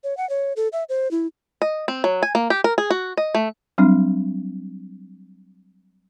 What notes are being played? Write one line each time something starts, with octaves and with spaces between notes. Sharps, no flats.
C#5
F#5
C#5
A4
E5
C5
E4
D#5
C4
F#3
G#5
A#3
G4
A#4
G#4
F#4
D#5
A3
F#3 G3 C4 D4